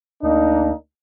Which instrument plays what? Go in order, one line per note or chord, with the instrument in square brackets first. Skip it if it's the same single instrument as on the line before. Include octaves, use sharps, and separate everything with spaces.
[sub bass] D2 [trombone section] A#3 D4 D#4